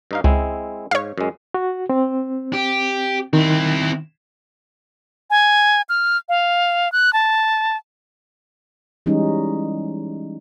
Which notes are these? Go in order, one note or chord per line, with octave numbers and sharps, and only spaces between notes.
G2 D#4 F5
C#2 G#3 C4 E4
G#2 C#5 F5
F#2 G#3
F#4
C4
G4
D#3 C4 E4
G#5
F6
F5
F#6
A5
E3 G3 G#3 C#4 D#4